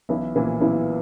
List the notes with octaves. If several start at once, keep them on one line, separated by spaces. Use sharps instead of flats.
B1 E3 E4
A#2 E3 F3 E4
B1 E3 E4